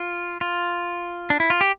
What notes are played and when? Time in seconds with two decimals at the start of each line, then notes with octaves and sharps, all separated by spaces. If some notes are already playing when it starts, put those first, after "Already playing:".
Already playing: F4
0.41 F4
1.30 D4
1.40 E4
1.50 F4
1.61 G4